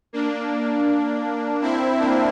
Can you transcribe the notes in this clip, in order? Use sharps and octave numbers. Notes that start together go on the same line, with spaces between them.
A#3 D4
C4 E4
A#3 D4